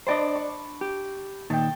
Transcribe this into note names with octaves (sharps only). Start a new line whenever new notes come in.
D4 C5 D5 D#5 A5 B5
C#6
G4
A#2 D#3 G5 A5